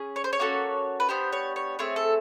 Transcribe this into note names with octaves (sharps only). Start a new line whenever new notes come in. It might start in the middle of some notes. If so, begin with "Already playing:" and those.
Already playing: C#4 G#4
C#5
C5
C#5
A#3 C#4 F#4 A4
B4
B3 D4 G4 C5
C#5
C#5
A3 C4 G#4 C#5
A4